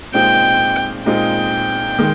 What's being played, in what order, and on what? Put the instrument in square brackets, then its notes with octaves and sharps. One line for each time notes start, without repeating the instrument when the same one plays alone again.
[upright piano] A#2 G#3 C4 D#4 [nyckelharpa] G5
[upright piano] A#2 G#3 C4 D#4 [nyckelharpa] G5
[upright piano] D#3 G#3